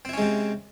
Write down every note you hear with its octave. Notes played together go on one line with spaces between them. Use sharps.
C3 G#3 C4 C#4 E4